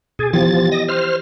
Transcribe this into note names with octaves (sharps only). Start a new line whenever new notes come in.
B2 G#4 G#6 A6
E3 F3 B3 G4 A6
D#5 A#6
C5 F6